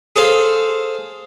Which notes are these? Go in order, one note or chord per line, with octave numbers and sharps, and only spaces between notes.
G#4 A4 C5 F5